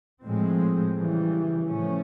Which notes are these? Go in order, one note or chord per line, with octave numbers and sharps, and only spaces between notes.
A2 F3 G#3 C4
C#3 E3 G3
A2 F3 A3 C#4